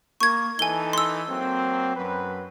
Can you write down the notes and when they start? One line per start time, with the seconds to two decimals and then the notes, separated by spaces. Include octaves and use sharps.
0.21 A#3 C#6 G#6
0.59 E3 D#4 A4 G#5 G7
0.93 C6 E6
1.29 F#3 A#3 C4
1.96 F#2 F#3 B4